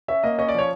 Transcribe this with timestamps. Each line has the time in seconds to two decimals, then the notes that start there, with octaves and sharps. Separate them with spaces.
0.08 C#4 E5
0.24 A#3 D#5
0.39 C#4 D#5
0.49 D5
0.54 F3 C#5